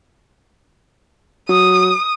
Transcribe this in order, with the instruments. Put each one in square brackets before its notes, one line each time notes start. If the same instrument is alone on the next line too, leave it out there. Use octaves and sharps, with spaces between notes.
[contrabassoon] F#3 [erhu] D#6